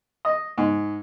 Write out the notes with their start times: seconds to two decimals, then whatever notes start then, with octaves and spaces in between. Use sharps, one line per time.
0.25 D#5
0.58 G#2